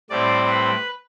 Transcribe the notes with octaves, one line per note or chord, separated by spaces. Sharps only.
A2 G3 C4 D5
B4